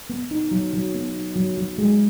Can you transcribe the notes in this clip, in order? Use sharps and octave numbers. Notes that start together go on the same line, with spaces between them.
B3
D#4
F#3
F#3
B3
D#4
F#3
F#3
G#3